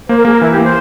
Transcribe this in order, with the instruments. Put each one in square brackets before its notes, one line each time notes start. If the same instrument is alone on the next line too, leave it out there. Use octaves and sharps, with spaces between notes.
[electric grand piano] A#3 [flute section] C5
[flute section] A#4
[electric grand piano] A#3 [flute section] G#4
[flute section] A#4
[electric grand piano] E3 [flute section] E4
[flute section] G4
[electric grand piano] A#3
[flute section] C5